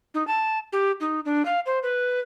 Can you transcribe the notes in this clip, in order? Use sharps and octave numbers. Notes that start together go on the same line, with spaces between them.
D#4
A5
G4
D#4
D4
F5
C5
B4